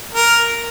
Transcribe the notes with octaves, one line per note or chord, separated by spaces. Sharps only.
A#4